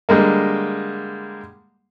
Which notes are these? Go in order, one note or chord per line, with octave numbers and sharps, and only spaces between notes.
D3 G3 G#3 A#3